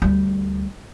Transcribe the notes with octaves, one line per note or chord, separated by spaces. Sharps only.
D2 G3